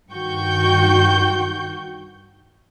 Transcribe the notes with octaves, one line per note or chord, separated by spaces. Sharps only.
G2 D#3 F#4 G5 C#6 G6